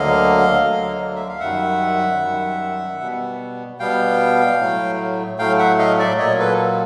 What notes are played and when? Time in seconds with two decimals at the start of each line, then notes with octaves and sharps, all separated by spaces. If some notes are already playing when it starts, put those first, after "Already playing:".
Already playing: D2 D3 F#3 A#3 D#5 F5
0.61 D2 D3 F#3 A#3
1.16 E5
1.29 F5
1.40 F#2 D#3 G3 E5 F#5
2.21 F#2 D#3 G3
3.00 B2 G3 B3
3.80 B2 G3 B3 F5 G5
4.60 A2 F#3 A3
5.39 A2 F#3 A3 F5 G5
5.59 E5 F#5
5.79 D#5 F5
5.99 D5 E5
6.18 A#2 F#3 A#3 C#5 D#5
6.39 A4 B4